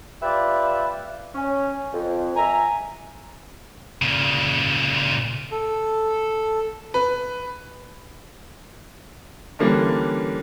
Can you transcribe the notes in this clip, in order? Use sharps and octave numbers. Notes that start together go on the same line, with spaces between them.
F4 G4 B4 D5 E5
C#4
F2
E5 G#5 A#5
A#2 C#3
A4
B4
D3 E3 G3 A#3 C#4 D4